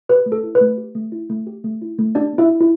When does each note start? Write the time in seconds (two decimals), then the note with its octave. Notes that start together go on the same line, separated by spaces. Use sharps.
0.09 G4 B4
0.26 A3
0.32 A4
0.43 E4
0.55 B4
0.61 A3
0.78 G4
0.95 A3
1.12 E4
1.30 A3
1.47 G4
1.64 A3
1.82 E4
1.99 A3
2.15 D4 G4 D5
2.33 B3
2.38 E4 E5
2.49 E4
2.61 E4